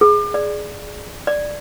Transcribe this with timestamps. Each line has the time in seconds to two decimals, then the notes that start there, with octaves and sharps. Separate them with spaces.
0.01 G#4
0.34 D5
1.27 D5